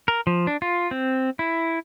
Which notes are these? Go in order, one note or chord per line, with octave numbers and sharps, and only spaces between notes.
A#4
F3
D4
F4
C4
E4